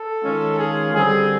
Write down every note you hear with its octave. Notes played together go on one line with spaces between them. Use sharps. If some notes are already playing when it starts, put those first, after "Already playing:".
Already playing: A4
D#3 G#3 C#4 F4
G#4
D3 G3 C4 G#4